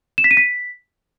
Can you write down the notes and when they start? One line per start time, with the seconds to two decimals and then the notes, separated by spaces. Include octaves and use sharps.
0.18 E7
0.24 B6
0.31 D#7
0.37 B6